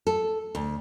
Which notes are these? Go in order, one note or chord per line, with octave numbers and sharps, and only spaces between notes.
A4
D2